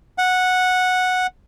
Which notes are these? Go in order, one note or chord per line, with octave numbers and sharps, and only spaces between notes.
F#5